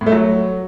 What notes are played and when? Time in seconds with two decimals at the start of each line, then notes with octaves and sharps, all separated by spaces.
0.01 A2
0.06 A3
0.12 F#3